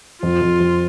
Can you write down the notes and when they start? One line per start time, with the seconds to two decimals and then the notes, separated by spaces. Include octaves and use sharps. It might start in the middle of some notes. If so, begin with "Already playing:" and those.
0.23 F2 F4
0.42 F2
0.60 F2